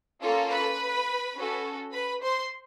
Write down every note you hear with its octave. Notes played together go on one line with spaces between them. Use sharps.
A#3 C#4 F4 A4
B4 B5
C#4 F#4 A4
B4 B5
C5 C6